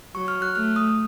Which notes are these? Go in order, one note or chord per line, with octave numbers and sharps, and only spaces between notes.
F#3 C#6
F6
F#6
A3 F6
D#6